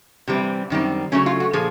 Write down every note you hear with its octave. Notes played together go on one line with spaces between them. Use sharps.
C3 E3 G3 C4
F#2 D#3 G3 C4
C#3 F#3 A3 C#4
F4
F#4
A#2 F3 G#4